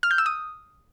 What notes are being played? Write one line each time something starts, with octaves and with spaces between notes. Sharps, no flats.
F6
G6
E6
D#6